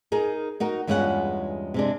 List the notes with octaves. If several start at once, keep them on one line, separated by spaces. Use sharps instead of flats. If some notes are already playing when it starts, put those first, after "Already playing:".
D#4 G#4 A#4
D#4 F#4 A#4
E2 G2 G#3 C#4 F4 F#5
C3 G#3 D4